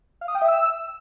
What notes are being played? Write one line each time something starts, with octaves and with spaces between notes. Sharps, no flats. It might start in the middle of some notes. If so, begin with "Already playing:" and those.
F5
D#6
G5
E5
E6